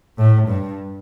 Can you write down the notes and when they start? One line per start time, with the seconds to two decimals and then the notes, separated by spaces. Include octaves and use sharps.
0.18 A2
0.48 G2